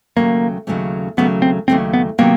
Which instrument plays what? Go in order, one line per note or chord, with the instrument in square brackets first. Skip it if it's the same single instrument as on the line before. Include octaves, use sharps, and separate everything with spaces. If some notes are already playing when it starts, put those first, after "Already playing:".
[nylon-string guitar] D#2 C#3 F#3 A3 C#4 [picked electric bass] A#3
[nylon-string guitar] D#2 C#3 F#3 A3 C#4
[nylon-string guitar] D#2 C#3 F#3 A3 C#4 [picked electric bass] B3
[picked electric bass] C4
[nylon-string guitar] D#2 C#3 F#3 A3 C#4 [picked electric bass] C4
[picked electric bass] B3
[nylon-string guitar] C3 D#3 F#3 B3 [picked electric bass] A#3